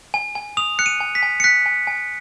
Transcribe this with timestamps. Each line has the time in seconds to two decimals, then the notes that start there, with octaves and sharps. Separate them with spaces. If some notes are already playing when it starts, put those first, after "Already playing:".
0.14 G#5
0.35 G#5
0.57 D#6 F7
0.79 F#6 C#7
0.86 D#7
1.01 G#5
1.15 B6
1.23 G#5
1.40 C#7
1.44 F#6 B6
1.66 G#5
1.87 G#5